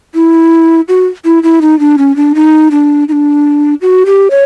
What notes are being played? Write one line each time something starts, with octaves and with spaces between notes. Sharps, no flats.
E4
F#4
E4
E4
D#4
D4
C#4
D4
D#4
D4
D#4
D4
F#4
G4
C#5